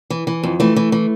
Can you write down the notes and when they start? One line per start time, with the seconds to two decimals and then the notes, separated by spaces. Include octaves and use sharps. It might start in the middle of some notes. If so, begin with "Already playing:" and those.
0.10 E3
0.27 E3
0.43 F2
0.60 E3 A3
0.76 E3
0.92 E3